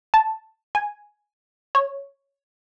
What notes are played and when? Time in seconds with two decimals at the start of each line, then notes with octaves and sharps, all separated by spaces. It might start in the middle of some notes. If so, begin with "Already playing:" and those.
0.14 A5
0.75 G#5
1.75 C#5